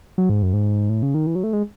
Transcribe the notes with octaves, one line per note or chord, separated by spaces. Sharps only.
F#3
G#2
F#2
G#2
A2
C#3
D#3
E3
F#3
A3
G#3